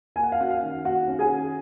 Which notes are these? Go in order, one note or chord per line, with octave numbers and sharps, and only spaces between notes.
A#3 G#5
F#5
F5
C#4 F#4 F#5
F5
D#3
A#3 F#4 F#5
C#4
G#4 G#5
D#3